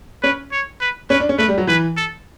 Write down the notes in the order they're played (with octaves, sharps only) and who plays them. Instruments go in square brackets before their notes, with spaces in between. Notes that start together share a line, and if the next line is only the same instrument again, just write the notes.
[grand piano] C#4 [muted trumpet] B4
[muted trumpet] C#5
B4
[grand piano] C#4 [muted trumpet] B4
[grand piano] D4
C#4
[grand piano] A3 [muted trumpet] B4
[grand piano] G3
F#3
[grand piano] E3 [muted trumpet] B4
[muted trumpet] A4